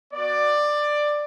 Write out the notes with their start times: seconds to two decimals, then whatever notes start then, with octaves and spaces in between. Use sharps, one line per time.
0.13 B3 F#4 D5